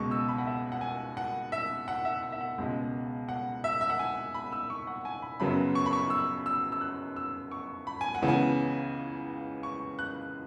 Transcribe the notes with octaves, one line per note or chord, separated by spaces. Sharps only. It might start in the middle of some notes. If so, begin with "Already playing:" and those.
Already playing: C#2 B2 G#3 C#6
E6
B5
F#5
E5
F#5
G#5
F#5
E5
F#5
E5
F#5
E5
F#5
C#2 B2 G#3
F#5
E5
E5
F#5
G#5
B5
E6
C#6
F#5
G#5
B5
F#2 C#3 F#3 B3 B5
C#6
B5
C#6
E6
E6
E6
F#6
E6
C#6
B5
G#5
F#5
C#2 C#3 E3 B3
G#5
C#6
F#6